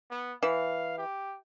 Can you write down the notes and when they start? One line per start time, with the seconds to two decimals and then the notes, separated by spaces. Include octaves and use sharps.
0.10 B3
0.43 E3 F5
0.98 G4